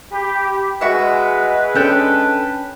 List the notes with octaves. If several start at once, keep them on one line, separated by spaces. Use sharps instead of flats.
G4 B5
G#3 F#4 B4 E5
C#4 D4 A4 G5